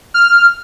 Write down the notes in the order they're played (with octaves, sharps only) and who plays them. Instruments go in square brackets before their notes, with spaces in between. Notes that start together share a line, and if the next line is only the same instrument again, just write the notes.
[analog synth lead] F6